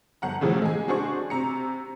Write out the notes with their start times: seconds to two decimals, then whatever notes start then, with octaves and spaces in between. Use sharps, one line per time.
0.22 G1 F#5 A#5
0.41 A2 C#3 E3 F3
0.62 G#3 G#5
0.88 D4 F#4 G#4 C5 C#6
1.30 C3 A#5 C#7